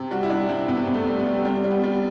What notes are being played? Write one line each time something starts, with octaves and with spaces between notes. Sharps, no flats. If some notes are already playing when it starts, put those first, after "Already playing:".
Already playing: C3
G3 F#4
E4
G3 D4
C3 C4
C3 B3
C3
A3
G3
B3
G3
G3 C4
G3
B3
G3